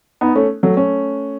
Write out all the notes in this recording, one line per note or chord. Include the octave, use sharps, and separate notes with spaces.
B3 D#4
A3 C#4
F#3 A3
A3 C#4